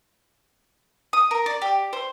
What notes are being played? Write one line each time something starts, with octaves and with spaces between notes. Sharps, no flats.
D#6
A#4
D5
G4
C5